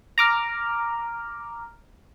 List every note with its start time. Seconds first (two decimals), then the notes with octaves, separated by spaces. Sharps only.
0.18 A#5 D6 F6